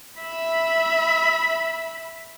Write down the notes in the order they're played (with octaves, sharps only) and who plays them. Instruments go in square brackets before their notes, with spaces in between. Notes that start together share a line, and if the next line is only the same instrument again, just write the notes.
[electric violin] E5 B5